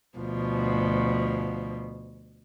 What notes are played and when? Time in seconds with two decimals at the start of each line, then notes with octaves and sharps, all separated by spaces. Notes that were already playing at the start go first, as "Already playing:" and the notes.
0.18 D2 B2 F3